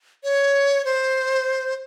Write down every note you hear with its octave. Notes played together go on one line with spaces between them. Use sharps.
C#5
C5